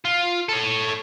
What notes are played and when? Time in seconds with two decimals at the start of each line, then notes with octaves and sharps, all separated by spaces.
0.05 F4
0.49 A4 C#5